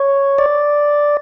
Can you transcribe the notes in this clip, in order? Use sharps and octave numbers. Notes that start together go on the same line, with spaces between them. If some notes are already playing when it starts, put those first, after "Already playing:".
Already playing: C#5
D5